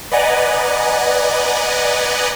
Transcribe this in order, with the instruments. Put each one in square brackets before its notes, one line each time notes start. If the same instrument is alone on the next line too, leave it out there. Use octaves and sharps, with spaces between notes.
[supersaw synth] B4 D5 D#5 F#5 G#5 A#5